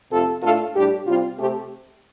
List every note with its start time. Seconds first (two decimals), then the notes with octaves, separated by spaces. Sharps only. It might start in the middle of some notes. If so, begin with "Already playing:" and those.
0.11 F2 C3 A3 C4 F4 A4
0.43 A2 A3 D4 F4 A4
0.75 A2 G3 D4 G4
1.06 C3 G3 C4 F4
1.38 C3 A3 C4 G4